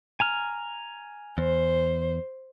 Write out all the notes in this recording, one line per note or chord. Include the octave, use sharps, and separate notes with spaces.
G#5 A#5 F6
E2 C5